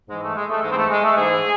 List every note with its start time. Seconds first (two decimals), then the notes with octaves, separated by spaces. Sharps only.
0.09 G#2 E3 G#3
0.22 A3
0.35 G#3
0.50 A3
0.62 G#2 E3 G#3
0.71 C4
0.76 A3
0.90 G#3
1.03 A3
1.16 G#2 E3 G#4